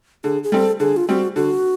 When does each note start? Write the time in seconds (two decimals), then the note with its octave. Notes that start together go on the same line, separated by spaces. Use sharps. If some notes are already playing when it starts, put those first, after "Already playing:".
0.24 D3 G#4
0.43 G#4
0.52 G3 C4 A4
0.80 D3 G#4
0.97 F4
1.08 G3 C4 F#4
1.36 D3 F#4